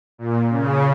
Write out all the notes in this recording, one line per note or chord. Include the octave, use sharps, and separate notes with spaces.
A#2
C#3